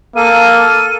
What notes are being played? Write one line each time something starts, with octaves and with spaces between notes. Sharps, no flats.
A#3 A4 F5 D#7